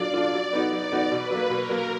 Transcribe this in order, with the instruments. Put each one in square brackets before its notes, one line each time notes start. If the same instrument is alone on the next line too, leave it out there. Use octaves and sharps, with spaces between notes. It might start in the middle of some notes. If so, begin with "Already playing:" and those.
Already playing: [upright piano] F#3 D4 F4 [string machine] D5
[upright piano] D4 F4
F#3
B3 D#4 F#4
[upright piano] F#3 [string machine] D5
[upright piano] B3 D#4 F#4
[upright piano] B2 [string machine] B4
[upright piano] F#3 A#3
[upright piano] B2 [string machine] A#4
[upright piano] F#3 A#3